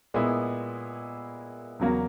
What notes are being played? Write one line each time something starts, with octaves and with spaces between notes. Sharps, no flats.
A#2 G#3 B3 E4
E2 C#3 F#3 A#3